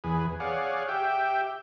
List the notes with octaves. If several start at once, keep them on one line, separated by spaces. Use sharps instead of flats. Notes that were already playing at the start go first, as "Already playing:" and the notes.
E2 G#4 B4
G#4 C#5 D5 F5 F#5
G4 E5 G5